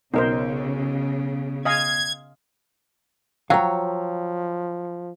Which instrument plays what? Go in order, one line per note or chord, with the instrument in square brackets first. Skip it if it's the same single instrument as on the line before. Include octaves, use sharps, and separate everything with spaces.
[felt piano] B1 [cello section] C#3 [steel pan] D#4 A#4 C5
[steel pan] D#5 F5 G#5 [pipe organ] G#6
[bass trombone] F3 [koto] F#3 [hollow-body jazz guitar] C#5 F5 [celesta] G5 A#5 E6